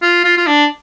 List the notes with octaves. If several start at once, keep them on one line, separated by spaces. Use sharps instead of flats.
F4
F4
F4
D4